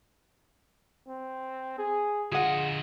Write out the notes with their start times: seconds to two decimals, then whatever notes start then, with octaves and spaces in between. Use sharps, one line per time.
1.08 C4
1.78 G#4
2.32 D3 F4 G#4 D#5 F#5